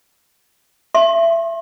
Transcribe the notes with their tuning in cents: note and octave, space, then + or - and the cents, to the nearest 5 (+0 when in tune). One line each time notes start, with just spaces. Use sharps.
E5 +25 C6 +40